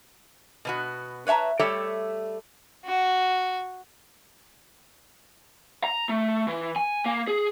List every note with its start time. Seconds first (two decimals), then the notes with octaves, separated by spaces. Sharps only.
0.65 B2 B3 F#4
1.27 B4 C#5 E5 A5 A#5
1.59 G3 A3 G4 A4 C#5 E5
2.85 F#4
5.84 A#5
6.09 A3
6.48 E3
6.76 G#5
7.06 A#3
7.27 G#4